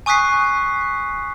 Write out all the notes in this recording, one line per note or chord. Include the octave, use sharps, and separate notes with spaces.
G#5 C#6 D#6 F#6 B6 C7